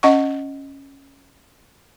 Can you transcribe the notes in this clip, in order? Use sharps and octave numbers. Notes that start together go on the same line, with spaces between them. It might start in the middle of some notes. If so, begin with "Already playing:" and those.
C#4 D#5 F#5 C#6